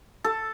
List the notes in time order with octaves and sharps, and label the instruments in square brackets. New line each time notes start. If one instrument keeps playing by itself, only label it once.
[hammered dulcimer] A4